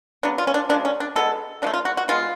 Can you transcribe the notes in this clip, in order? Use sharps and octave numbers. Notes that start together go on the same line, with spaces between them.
C#3 F#3 B3 D4
F4
C#4
D4
C#3 F3 G#3 D4
C#4
D4
B2 G#3 B3 A4
C#3 F3 A3 D4
F4
F#4
F#4
B2 G#3 B3 F4